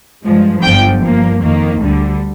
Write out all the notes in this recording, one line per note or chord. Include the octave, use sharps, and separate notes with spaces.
G2 F3 G#3
G1 G2 D3 F3 G5
G2 F3 A#3
F2 D#3 A#3
D2 D3 G3